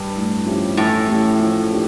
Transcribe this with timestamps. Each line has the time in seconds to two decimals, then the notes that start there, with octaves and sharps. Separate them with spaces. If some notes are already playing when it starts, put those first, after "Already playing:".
Already playing: G2
0.14 A2
0.46 F3 C#4 E4 G4
0.77 A2 E3
1.08 A3 C#4 E4 G4
1.40 F3
1.71 A#3 D4 G4